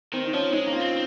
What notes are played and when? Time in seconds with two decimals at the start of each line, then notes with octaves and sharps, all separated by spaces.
0.13 D#3 C4
0.26 D#4
0.33 F3 C#4
0.53 G#3 D#4
0.66 A#3
0.72 F4
0.80 C4